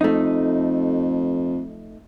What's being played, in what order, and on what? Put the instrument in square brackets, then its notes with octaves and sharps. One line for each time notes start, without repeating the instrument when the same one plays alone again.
[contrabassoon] F2 [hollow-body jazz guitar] A3 D#4